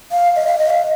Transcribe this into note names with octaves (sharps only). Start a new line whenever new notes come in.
F5
D#5
F5
D#5
F5